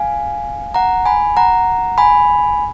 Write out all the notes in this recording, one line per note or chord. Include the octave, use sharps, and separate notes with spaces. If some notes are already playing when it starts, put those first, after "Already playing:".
Already playing: F5 G#5
F#5 A#5
G#5 B5
F#5 A#5
G#5 B5